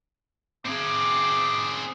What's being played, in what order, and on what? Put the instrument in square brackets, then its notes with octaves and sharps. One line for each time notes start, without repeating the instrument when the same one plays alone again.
[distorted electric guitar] C4 G#4 [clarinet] D6